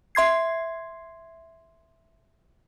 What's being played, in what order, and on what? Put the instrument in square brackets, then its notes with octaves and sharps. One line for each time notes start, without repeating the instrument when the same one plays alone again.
[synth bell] E5 C6 G#6 C7